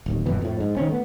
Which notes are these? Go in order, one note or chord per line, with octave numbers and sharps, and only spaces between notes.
D1 D#2
D#1 F#2 B2 E3
F2 A2
G#2
D#3 C4 C#4
A3 B3